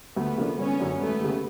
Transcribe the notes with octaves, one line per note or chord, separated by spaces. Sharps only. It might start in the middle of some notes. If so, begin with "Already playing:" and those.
D2 A3 B3
C#3 F3 A#3 D4
G#1 B3 C#4
F#2 D3
E1 A3 B3
D#2 C#3